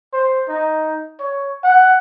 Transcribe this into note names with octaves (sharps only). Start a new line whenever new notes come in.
C5
D#4
C#5
F#5